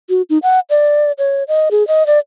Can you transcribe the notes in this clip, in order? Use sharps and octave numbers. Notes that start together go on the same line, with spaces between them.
F#4
D#4
F#5
D5
C#5
D#5
G#4
D#5
D5